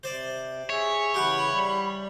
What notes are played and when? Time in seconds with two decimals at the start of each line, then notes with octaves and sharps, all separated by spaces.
0.03 C3 C5 D5
0.70 G#4 C#5 E5
1.14 C#3 E3 G4 F#5 B5
1.51 G3